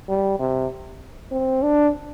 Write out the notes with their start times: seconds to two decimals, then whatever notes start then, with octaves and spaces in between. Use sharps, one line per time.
0.09 G3
0.39 C3
1.32 C4
1.63 D4